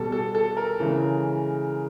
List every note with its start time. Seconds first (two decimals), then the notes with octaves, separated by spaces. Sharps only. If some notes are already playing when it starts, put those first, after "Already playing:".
Already playing: B2 G3 A4
0.12 A4
0.35 A4
0.57 A#4
0.79 C#3 E3 G#3